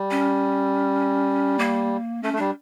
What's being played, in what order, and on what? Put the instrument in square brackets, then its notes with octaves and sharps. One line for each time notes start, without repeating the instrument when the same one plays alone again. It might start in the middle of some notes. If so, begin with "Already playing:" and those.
Already playing: [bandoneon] G3
[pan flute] C#4
A#3
[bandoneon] A3 [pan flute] C#4
[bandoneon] A3
[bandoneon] G3 [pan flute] D4